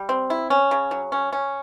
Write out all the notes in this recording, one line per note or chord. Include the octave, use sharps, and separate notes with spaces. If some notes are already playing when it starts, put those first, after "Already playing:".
Already playing: G3
C4
E4
C#4
C#3
F#3
C#4
C#4